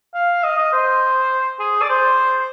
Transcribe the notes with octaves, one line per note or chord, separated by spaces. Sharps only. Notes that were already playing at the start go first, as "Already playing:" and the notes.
F5
D#5
D#5
C5
G#4
D5
C5